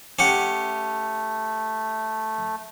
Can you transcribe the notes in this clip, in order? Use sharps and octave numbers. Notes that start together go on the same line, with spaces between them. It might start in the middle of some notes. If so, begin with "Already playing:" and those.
A3 C#4 G4 F#5